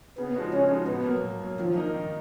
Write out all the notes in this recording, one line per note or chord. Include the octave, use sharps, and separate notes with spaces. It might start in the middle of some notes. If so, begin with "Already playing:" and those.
C#3 B3
F3 G#3 D#4 F#4
C#3 C#4
F3 G#3 D#4 F#4
B2 B3
F#3 A#3
B2
F#3 A#3
D#3 F3
A#3 D#4 A#4
D#3